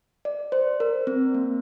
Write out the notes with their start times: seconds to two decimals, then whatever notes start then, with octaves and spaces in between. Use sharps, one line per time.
0.25 D5
0.52 C5
0.80 A#4
1.07 C4
1.34 A#3